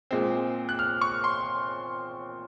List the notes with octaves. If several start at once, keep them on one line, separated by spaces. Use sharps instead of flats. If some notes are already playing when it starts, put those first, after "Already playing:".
A#2 G#3 C4
F#6
F6
C#6
C6